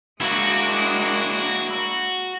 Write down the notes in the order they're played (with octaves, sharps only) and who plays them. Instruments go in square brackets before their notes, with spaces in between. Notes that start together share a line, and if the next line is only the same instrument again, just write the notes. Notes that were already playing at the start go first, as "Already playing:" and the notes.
[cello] G#3 D4 [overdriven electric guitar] A#3 E4 [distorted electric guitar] F#4